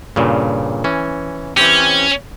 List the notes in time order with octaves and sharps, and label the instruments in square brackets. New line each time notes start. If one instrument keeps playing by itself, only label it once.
[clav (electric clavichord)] G2 A#2 C#3
E3 C#4
[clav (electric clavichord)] E3 C4 G4 [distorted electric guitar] C#4